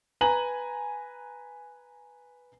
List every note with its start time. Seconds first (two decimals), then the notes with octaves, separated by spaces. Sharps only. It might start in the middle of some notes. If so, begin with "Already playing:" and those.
0.21 B4 G#5 A#5 F#7